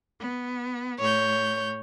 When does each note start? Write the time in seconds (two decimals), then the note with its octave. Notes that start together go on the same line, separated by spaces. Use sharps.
0.20 B3
0.99 A2 C#5 G6